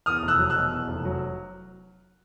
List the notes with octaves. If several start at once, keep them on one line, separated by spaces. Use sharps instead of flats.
E2 D#6 F6
F1
E6 F#6
F#3
E6 F#6
B2
E2
F1
F#3